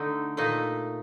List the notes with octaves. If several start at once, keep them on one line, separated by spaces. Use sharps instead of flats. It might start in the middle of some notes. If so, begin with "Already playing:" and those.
Already playing: D3 A3 D#4
A#2 A3 D#4